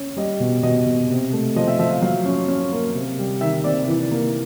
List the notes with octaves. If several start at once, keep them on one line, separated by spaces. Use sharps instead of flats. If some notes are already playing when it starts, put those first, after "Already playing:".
Already playing: C#4
G3 D#5
B2
B2 D#5
B2
C3
A3
F3 D#5
E5
F3 E5
F5
F#3 F5
C#4
C#4
A#3
C3
G3
D#3 E5
C3 D5
E3
A#3